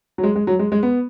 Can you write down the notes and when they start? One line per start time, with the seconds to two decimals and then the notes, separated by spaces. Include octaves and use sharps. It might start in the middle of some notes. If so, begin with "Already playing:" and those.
0.18 F#3
0.23 G#3
0.35 G#3
0.47 F#3
0.59 G#3
0.72 G#3
0.83 B3